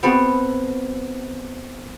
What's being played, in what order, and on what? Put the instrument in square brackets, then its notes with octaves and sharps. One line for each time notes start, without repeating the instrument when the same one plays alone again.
[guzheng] B3 C4 F#4 A4